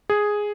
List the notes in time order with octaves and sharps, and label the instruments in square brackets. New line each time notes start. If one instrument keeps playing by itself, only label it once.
[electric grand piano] G#4